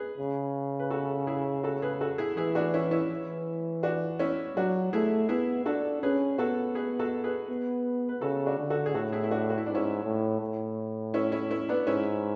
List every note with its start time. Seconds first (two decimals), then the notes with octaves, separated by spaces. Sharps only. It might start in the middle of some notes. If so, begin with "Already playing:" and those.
Already playing: G#4 B4
0.18 C#3
0.79 B4
0.90 F#4 A4
1.27 E4 G#4
1.63 F#4 A4
1.82 G#4 B4
2.01 F#4 A4
2.18 E4 G#4
2.37 E3 E4 G#4
2.55 D4 F#4
2.74 C#4 E4
2.91 C#4 E4
3.10 E3
3.83 D4 F#4
4.19 C#4 E4
4.56 F#3 D4 F#4
4.93 A3 E4 G#4
5.29 B3 E4 G#4
5.66 D4 F#4 A4
6.02 C#4 G#4 B4
6.38 B3 F#4 A4
6.75 G#4 B4
6.99 F#4 A4
7.24 G#4 B4
7.49 B3
8.09 B4
8.21 C#3 F#4 A4
8.46 D4 F#4
8.58 D3
8.70 F#4 A4
8.86 G#4
8.94 A2 F#4 A4
9.12 E4 G#4
9.24 E4
9.31 D4 F#4
9.50 F#4
9.58 E4
9.66 G#2 D4
9.75 C#4 E4
10.04 A2
10.41 A2
11.14 C#4 E4
11.32 C#4 E4
11.51 C#4 E4
11.69 B3 D4
11.87 G#2 C#4 E4